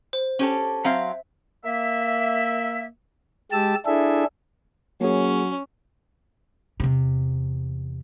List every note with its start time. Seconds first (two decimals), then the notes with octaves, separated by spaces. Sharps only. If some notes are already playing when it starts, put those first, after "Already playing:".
0.13 C5
0.39 C#4 G4 A4
0.85 F#3 C4 E5 F5
1.64 A#3 E5
3.52 G#3 G4 A5 E6
3.86 D4 E4 G#4 A4 E5
5.01 F#3 A#3 C#4 G#4
6.80 E2 C3